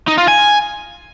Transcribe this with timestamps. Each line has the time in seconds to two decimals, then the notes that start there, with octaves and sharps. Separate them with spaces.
0.08 D#4
0.18 F4
0.28 G#5